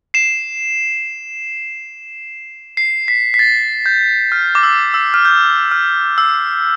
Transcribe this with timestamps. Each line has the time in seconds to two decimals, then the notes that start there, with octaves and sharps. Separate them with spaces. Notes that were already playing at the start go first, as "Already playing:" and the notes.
0.14 C7 E7
2.77 C7
3.08 B6
3.34 B6
3.39 A6
3.86 G6
4.32 F6
4.55 D6
4.63 E6
4.94 E6
5.14 F6
5.25 G6
5.71 F6
6.18 E6